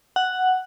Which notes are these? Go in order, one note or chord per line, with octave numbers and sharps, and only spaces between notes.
F#5